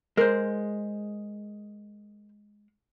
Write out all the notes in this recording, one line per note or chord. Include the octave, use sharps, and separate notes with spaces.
G#3 A#4 C5